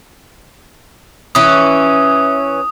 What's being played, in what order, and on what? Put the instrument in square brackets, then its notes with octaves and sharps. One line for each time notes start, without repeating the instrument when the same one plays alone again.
[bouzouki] E3 C#4 [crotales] D#6